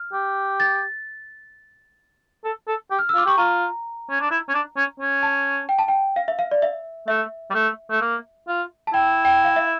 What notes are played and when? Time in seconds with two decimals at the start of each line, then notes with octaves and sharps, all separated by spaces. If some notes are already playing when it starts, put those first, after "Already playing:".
Already playing: F6
0.13 G4
0.60 A6
2.44 A4
2.68 A4
2.91 G4
2.99 F6
3.09 E6
3.15 F4 D6
3.26 G4 C#6
3.38 F4 A#5
4.10 C#4
4.21 D4
4.31 E4
4.49 C#4
4.54 D4
4.77 C#4
5.00 C#4
5.23 A5
5.69 G5
5.79 A5
5.88 G5
6.16 F5
6.28 E5
6.39 F5
6.51 D5
6.62 E5
7.08 A3 E5
7.50 G3
7.54 A3
7.91 A3
8.01 A#3
8.48 F4
8.87 A5
8.93 E4 G5
9.25 G5
9.44 F5
9.56 E5